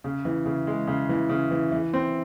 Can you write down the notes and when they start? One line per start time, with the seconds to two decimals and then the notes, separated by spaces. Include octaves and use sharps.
0.04 C#3
0.25 E3
0.46 C#3
0.67 G#3
0.87 C#3
1.09 E3
1.29 C#3
1.51 E3
1.72 E3
1.94 C4